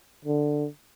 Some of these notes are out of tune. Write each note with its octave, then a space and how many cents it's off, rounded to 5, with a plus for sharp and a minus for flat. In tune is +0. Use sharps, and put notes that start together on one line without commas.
D3 +10